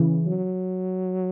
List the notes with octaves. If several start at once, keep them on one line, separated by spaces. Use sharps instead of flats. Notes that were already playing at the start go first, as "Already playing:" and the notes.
Already playing: C#3 E3
F#3